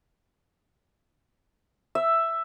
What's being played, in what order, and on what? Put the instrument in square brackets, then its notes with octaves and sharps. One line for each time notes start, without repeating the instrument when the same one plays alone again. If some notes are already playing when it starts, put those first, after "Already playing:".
[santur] E5